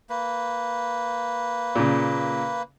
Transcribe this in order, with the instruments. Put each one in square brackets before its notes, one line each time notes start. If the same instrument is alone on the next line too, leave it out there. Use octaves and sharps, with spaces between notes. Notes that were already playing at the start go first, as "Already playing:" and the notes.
[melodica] A#3 B4
[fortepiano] A#2 C#3